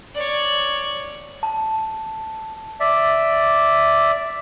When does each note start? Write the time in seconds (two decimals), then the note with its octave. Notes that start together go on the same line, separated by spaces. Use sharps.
0.15 C#5 D5
1.43 A5
2.80 D5 E5